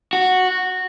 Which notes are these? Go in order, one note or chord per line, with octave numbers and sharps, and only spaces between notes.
F#4